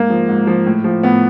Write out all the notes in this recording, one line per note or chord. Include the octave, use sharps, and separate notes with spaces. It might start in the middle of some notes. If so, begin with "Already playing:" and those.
Already playing: G#2 A#3
F3
G#2
F3
A2
F3
A2 B3